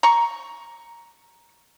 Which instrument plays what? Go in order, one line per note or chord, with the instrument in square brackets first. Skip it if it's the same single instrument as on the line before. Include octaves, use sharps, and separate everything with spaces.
[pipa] A#5 C#6